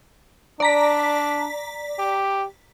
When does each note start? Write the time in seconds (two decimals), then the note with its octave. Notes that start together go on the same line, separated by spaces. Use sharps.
0.60 D4 D5 A#5 B6
1.99 G4